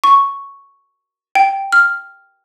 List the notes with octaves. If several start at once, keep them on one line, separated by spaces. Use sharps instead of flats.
C#6
G5
F6